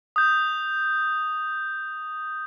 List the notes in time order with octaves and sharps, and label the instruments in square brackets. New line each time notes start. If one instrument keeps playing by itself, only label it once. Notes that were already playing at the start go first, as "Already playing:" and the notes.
[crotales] D#6 G6